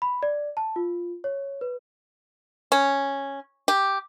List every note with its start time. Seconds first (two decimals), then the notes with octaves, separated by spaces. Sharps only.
0.02 B5
0.23 D5
0.57 A5
0.76 F4
1.24 C#5
1.61 B4
2.72 C#4
3.68 G4